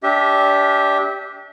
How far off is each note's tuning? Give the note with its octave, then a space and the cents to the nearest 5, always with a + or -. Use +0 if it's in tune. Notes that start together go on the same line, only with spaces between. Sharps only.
D4 -30 G4 +0 E5 -35